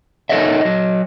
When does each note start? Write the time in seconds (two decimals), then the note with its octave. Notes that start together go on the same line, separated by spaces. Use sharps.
0.29 D#4 A4 A#4 C#5 D#5 E5
0.61 F#3 D#5